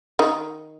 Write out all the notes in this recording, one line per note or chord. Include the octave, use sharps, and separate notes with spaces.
D#3 D#4